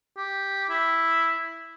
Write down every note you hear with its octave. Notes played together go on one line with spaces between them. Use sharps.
G4
E4